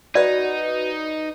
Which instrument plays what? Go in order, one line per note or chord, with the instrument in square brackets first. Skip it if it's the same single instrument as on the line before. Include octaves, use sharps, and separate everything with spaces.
[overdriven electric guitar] D#4 [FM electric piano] F#4 B4 [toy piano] D5